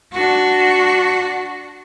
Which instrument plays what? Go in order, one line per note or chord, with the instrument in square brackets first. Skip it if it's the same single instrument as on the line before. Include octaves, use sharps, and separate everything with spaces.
[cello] D4 F#4